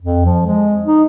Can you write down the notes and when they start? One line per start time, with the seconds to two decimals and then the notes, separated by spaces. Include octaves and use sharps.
0.02 F2
0.25 F3
0.46 G#3
0.85 D#4